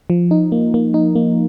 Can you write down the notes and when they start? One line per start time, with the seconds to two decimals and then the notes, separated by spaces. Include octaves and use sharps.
0.10 F3
0.31 D#4
0.52 A#3
0.74 A#3
0.94 D#4
1.15 A#3